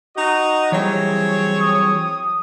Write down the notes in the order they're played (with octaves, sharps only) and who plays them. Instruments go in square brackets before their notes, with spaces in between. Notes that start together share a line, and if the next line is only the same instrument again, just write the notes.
[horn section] D#4 F#4 D#5
[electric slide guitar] E3 F#3 G3 [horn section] C4 G#4 C#5
[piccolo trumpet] D#6